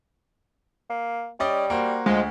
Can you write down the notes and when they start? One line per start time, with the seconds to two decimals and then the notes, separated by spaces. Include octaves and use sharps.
0.90 A#3
1.40 G3 C#4 D5 D#5
1.70 A#3 F#4 C5
2.06 D2 F3 G#3